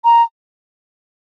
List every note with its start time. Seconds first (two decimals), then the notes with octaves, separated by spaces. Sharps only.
0.05 A#5